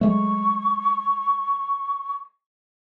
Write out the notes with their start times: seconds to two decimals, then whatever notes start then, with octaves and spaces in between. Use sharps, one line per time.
0.01 F#3 G#3 A3 C#6